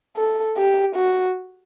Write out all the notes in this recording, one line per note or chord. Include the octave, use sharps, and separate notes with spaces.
A4
G4
F#4